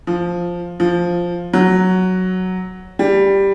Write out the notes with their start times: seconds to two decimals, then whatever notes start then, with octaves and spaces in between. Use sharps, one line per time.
0.07 F3
0.80 F3
1.53 F#3
2.99 G3